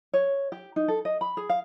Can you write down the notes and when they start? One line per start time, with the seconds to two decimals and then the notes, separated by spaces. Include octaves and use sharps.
0.13 C#5
0.52 G4
0.76 D#4
0.88 A4
1.05 D#5
1.21 B5
1.37 G#4
1.49 F5